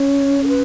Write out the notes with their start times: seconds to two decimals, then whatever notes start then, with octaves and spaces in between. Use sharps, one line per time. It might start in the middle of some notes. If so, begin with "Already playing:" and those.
Already playing: C#4 C#5
0.44 A4
0.48 B4